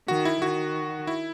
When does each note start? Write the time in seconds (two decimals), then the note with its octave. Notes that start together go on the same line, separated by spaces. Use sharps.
0.08 D#3 F#4
0.25 E4
0.42 D#3 F#4
1.07 E4